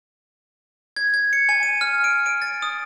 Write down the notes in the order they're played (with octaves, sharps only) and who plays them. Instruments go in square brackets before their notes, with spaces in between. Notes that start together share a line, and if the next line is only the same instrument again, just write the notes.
[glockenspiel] G#6
G#6
C#7
G#5
D#7
F6
D7
D7
A6
D#6